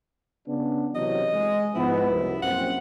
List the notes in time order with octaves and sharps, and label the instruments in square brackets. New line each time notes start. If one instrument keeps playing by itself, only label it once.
[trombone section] C#3 B3 D4
[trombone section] C3 E3 F#3 [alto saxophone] D#5
[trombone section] G#3
[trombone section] G#2 F3 B3 [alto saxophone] E4
[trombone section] C2 F#2
[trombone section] A#1 F#2 C4 [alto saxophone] F#5